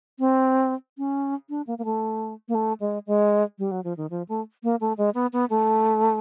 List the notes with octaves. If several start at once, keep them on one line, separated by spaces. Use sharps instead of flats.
C4
C#4
D4
A#3
A#3
A3
A#3
A3
G#3
G#3
G3
F#3
F3
D#3
F3
A3
A#3
A3
G#3
B3
B3
A3